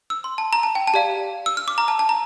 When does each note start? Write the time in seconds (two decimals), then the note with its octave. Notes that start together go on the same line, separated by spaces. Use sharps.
0.10 E6
0.24 C6
0.38 A5
0.53 A#5
0.63 A5
0.75 G5
0.87 A5
0.94 G4 D5 F5
1.46 E6
1.57 F6
1.68 D6
1.78 A#5
1.88 A5
1.99 A5
2.09 A#5